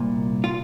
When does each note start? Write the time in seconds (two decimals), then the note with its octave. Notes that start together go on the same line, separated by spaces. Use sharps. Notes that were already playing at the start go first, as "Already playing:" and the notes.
Already playing: C2 A#2
0.44 F4